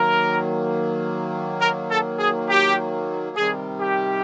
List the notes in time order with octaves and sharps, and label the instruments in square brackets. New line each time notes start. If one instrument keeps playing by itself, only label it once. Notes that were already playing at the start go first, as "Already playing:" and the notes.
Already playing: [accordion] D#3 F#3 A#3 [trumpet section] A#4
[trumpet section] A#4
A4
G#4
G4
[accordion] C3 D#3 G3 [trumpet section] G#4
[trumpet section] G4